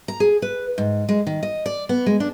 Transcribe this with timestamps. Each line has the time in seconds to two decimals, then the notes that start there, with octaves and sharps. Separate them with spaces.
0.08 A#5
0.20 G#4
0.42 B4
0.78 G#2
1.09 G#3
1.27 D#3
1.43 D#5
1.66 D5
1.89 B3
2.06 G#3
2.20 D4